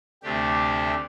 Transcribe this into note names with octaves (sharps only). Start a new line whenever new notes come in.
D2 C3 A3 D4 G4